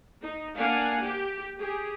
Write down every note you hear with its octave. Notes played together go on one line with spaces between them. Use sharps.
D#4
A#3 D4 F5 F#5 G#5
G4
G4 G#4